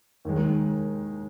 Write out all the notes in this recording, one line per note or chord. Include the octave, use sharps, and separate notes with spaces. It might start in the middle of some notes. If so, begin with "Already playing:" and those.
D#2 D#3 G#3